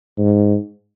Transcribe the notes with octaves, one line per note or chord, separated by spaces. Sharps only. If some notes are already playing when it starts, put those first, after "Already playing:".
G#2